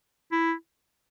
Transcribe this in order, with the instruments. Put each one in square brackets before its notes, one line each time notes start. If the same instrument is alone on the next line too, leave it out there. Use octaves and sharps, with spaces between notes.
[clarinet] E4